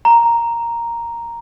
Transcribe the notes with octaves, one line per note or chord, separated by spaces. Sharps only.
A#5